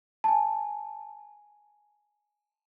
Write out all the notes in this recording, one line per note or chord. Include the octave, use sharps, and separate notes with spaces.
G#5 A5